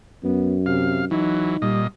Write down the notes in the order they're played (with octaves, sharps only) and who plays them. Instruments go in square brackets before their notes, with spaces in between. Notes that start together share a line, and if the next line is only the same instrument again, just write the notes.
[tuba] F#2 [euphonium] B3
[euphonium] C3 [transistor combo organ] F5
[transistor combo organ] E3 F#3 [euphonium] D#4
[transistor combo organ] A#2 D#5 [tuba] G3